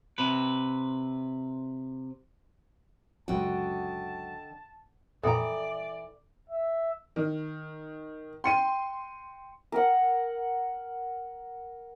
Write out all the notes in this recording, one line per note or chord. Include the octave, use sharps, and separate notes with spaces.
C3 B4
C#2 F#2 D3 F#4 D#5 G5 A5
F2 A#2 E3 A4 D5 E5 G5 A#5
E5
D#3
G5 C6 C#7 D#7
A#4 F#5